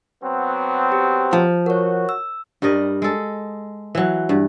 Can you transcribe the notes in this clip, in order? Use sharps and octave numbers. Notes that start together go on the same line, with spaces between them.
F#3 B3 C4
G4
F3
F#4 A#4 C#5
E6
G2 G3 A#4 D#5
G#3 A4
E3 F#3
G2